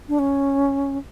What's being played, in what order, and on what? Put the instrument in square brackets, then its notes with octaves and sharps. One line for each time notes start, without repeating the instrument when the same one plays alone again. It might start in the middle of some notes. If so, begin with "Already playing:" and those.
[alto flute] D4
C#4